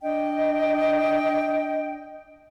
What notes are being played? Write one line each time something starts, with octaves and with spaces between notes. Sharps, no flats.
D4 D#5 G5